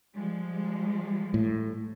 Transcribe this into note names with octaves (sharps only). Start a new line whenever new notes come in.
F3 G3 G#3
A2